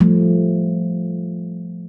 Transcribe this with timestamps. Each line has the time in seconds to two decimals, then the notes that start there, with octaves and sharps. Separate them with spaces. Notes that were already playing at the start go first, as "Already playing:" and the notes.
0.01 F3 G3 A3